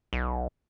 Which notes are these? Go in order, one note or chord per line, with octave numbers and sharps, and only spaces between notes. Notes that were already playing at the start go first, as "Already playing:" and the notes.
B1